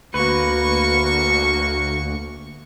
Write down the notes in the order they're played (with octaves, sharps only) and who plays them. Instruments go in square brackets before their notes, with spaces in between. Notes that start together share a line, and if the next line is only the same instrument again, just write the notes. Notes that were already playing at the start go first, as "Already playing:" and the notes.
[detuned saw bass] D2 [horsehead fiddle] A#3 F#4 [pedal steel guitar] B4 [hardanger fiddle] C#6